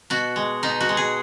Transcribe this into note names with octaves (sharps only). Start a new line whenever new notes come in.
B2 F#4
G#3
B2 D#4
F#4
G#3
G#4